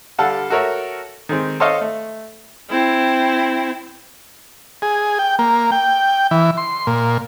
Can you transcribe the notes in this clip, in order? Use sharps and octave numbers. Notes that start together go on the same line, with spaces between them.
D3 G3 A4 F5 F#5 A5
F#4 A4 A#4 C#5 E5
D#3 G#3 C4
A4 C5 C#5 D#5 F5
A3
C4 E4
G#4
G5
A#3
G5
E3
C6
A#2